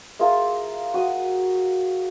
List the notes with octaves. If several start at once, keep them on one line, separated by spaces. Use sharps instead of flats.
F4 G#4 A#4 E5
F#4 D#6